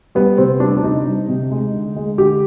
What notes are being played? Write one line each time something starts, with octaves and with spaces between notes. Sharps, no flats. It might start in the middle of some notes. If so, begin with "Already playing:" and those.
G3 B3
C3 C4
G3 D4
D4
C3 D#4
G3
C3
G#3
D3
G#3
D3 G4